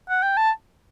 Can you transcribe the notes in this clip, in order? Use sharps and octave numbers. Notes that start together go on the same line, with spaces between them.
F#5
G5
A5